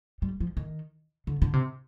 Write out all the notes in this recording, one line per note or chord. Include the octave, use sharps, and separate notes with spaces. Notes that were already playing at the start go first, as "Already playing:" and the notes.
G3
F3
D#3
D3
D3
C3